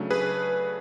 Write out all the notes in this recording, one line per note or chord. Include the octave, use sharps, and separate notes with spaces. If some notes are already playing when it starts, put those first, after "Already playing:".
Already playing: C#3 F#3 A3 D4
G#4 B4